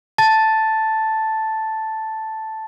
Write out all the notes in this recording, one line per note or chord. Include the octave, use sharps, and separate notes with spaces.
A5 A6